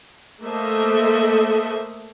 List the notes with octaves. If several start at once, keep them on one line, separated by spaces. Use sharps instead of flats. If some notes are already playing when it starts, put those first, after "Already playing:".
A3 A#3 A4 C5 D#5 E5